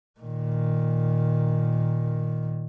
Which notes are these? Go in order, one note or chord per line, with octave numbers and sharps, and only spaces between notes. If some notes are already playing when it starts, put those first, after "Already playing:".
A#2 D#3